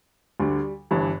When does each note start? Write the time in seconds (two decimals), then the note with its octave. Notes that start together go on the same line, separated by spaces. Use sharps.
0.40 D2 D3 G3
0.91 G1 G2 E3